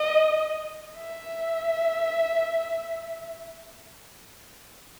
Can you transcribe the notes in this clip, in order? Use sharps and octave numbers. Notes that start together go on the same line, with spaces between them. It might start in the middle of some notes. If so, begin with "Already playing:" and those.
Already playing: D#5
E5